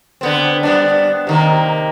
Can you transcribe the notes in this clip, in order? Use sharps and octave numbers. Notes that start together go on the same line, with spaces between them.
D3 B3 C4
G3 B3 D4
C3 D#3 A#3